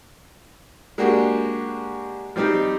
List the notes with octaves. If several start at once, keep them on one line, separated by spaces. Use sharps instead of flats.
G#3 A#3 D4 F#4 G4
F3 G3 C4 D#4 G4